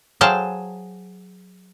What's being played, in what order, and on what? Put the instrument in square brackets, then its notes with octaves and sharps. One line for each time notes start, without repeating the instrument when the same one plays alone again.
[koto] F#3 G#4 C5 F5 G5 A5